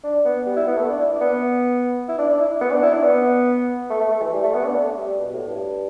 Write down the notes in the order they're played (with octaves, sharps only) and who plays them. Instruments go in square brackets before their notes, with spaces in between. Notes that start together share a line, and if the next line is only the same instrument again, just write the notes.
[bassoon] D4
B3
G3
E4
B3
A3
D4
E4
D4
B3
E4
D4
D4
E4
B3
D4
E4
D4
B3
A3
A3
A3
E3
G3
A3
B3
D4
A3
G3
B2
A2
G2